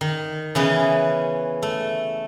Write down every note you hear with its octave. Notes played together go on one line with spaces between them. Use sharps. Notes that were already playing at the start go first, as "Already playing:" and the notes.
D#3
C#3 E3 B3 C#4
A3